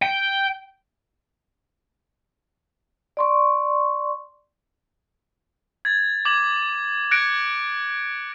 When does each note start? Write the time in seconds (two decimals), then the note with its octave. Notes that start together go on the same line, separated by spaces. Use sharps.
0.02 G5
3.17 D5 C6 C#6
5.85 G#6 A6
6.25 D6 G#6 F#7
7.11 F#6 G#6 A#6 C#7 D7